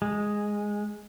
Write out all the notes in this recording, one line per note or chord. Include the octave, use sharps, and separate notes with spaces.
G#3